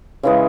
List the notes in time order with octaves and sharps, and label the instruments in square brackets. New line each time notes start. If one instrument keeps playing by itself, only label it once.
[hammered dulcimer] C#3 E3 G#3